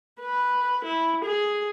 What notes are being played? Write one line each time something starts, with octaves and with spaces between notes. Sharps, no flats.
B4
E4
G#4